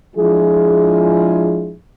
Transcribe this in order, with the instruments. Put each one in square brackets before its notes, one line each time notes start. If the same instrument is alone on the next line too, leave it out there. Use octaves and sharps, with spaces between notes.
[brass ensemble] F3 G#3 D4 E4 F4 G#4